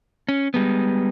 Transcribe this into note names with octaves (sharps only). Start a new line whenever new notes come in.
C#4
G3 G#3 B3